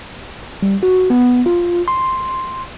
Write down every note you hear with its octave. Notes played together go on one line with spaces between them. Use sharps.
G3
F#4
B3
F4
C6